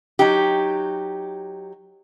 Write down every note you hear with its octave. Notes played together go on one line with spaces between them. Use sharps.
F#3 D#4 G4